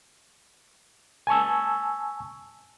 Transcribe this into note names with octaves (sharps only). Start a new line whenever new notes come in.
G#5 A5 C#6 E6